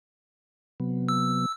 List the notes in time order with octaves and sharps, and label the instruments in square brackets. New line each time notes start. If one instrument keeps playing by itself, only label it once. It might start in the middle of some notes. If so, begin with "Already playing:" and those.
[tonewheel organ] C3 F#3 B3
[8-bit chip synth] E6